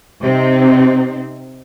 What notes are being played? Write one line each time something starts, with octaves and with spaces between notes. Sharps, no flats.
C3 C4 D#4